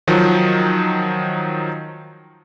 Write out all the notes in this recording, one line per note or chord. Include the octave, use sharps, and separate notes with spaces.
D#3 F3 F#3